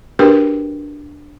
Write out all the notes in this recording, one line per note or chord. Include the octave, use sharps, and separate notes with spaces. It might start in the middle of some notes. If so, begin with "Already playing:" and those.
D4 F#4 G4 A#4 B4 G5